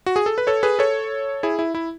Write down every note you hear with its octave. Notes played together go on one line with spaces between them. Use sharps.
F#4
G#4
A4
B4
A4 C#5
G#4 B4
A4 C#5
E4 G#4
E4
E4